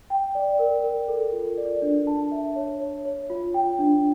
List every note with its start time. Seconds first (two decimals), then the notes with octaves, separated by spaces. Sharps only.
0.10 G5
0.35 D5
0.59 A#4
0.84 A#4
1.08 A4
1.33 F4
1.58 D5
1.82 D4
2.07 A5
2.32 E5
2.56 C#5
2.80 C#5
3.05 C#5
3.30 F4
3.54 G5
3.79 D4